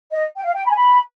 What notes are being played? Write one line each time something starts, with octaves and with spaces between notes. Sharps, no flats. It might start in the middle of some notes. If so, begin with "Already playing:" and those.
D#5
G5
F5
G5
B5
G#5
B5